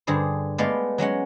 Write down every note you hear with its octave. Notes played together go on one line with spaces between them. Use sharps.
G2 D3 G#4 C5
G#3 A3 B3 D5 F5
F#3 G#3 C#4 F#5